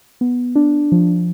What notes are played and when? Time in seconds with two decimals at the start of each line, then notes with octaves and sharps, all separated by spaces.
0.21 B3
0.56 D4
0.92 F3